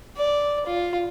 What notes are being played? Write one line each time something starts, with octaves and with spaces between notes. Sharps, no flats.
D5
F4